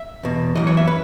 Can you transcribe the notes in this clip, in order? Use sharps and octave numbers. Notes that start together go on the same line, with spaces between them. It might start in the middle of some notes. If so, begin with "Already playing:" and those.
Already playing: E5
E2 B2
F#2 C#3 E3 D#5
C#5
E5
B4